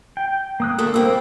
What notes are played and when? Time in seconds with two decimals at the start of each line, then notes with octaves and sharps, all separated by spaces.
0.17 G5
0.60 A#3 D#6 F#6
0.78 D3 A3 A#3 A4
0.94 G3 A#3 C4 G5 B5 E6